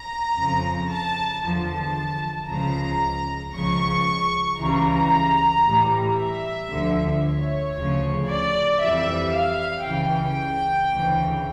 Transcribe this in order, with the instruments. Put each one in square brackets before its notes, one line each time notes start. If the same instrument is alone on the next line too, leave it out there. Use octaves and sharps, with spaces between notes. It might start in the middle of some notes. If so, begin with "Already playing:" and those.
Already playing: [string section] A#5
F2 C#3 F3
A5
E2 D3 F3 A5
C#2 C#3 F3 A#5
C#2 C#3 F3 C#6
C#2 C#3 E3 G3 A#5
A2 E3 G3
E5
D2 D3 F3
C#5
D2 C#3 F3
D5
F2 E3 G3 E5
F5
C#2 C#3 E3 G5
D2 C#3 E3